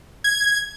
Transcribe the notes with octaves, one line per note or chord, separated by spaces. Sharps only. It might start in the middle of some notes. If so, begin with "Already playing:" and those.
G#6